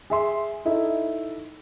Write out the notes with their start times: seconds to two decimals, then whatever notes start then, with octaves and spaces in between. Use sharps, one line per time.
0.10 G#4 E5 C6
0.65 D#4 E4 A4